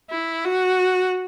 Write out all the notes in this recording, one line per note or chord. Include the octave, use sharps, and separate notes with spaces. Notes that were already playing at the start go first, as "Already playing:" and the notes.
E4
F#4